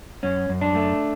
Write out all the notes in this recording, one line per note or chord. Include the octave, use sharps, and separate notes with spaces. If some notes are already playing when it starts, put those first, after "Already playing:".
F#2 C#4
F#2
D4
A3